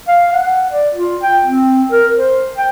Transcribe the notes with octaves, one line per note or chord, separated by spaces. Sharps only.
F5
F#5
D5
F4
G5
C4
A#4
C5
G5